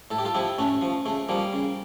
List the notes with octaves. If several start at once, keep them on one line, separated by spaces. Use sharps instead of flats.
A2 A4
G4
F4 A4
F3 E4 G4
A2 A3 C#4
F3
C#3 A3
F3 G3 A#3
C#3